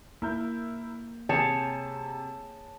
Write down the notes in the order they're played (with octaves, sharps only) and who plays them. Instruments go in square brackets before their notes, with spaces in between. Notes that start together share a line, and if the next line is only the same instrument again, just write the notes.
[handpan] A#3 [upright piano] E4 A#4 G6
[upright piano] C3 G6 E7 [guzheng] G#4 C#5 [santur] A5